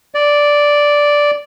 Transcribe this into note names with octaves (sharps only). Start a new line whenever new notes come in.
D5